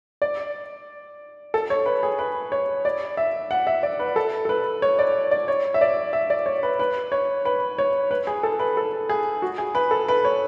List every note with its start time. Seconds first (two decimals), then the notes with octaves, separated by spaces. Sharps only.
0.22 D5
1.54 A4
1.70 C#5
1.86 B4
2.03 G#4
2.19 B4
2.52 C#5
2.85 D5
3.17 E5
3.51 F#5
3.67 E5
3.83 D5
4.00 B4
4.16 A4
4.45 A4
4.49 B4
4.82 C#5
4.99 D5
5.31 D5
5.48 C#5
5.74 E5
5.81 D5
6.13 E5
6.30 D5
6.46 C#5
6.63 B4
6.79 B4
7.12 C#5
7.45 B4
7.78 C#5
8.11 B4
8.27 G#4
8.43 A4
8.59 B4
8.77 A4
9.09 G#4
9.42 F#4
9.58 G#4
9.75 B4
9.91 A4
10.08 B4
10.25 C#5